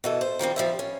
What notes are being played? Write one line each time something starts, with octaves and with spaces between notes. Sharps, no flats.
B2 E3 A4
C5
D#3 F3 G3 C4
F3 G3 E5
C#4